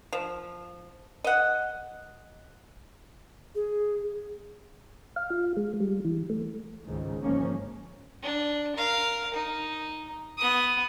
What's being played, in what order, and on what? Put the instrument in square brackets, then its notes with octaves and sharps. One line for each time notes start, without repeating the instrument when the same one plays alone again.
[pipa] F3
D#5 F#5
[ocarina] G#4
[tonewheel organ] F5
F4
G#3
G3
E3
A3
[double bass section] C#2 G#2 D#3
G1 G#2 F3 A#3 C#4
[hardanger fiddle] D4
A#4 F5
D#4
B3 D#6